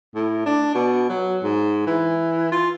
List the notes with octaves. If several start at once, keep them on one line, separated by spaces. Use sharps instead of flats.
A2
D4
B2
F#3
G#2
E3
F4